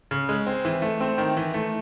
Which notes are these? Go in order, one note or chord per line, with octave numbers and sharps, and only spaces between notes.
C#3
G#3
C4
E3
A3
C4
D#3
E3
A3